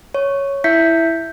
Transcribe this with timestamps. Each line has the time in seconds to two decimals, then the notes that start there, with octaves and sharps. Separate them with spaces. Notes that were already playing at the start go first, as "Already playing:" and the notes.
0.15 C#5
0.64 E4 E5 G6 B6 C#7